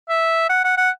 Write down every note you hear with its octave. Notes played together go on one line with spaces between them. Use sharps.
E5
F#5
F#5
F#5